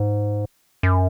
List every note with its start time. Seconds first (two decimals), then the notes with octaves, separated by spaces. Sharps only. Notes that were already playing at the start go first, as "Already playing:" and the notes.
Already playing: G#2
0.83 F#2